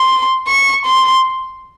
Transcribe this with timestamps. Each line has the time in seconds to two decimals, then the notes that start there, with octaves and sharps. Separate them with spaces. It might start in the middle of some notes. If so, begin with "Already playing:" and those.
Already playing: C6
0.48 C#6
0.86 C6